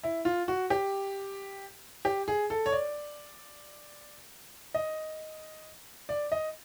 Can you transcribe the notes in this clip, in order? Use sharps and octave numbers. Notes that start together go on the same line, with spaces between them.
E4
F4
F#4
G4
G4
G#4
A4
C#5
D5
D#5
D5
D#5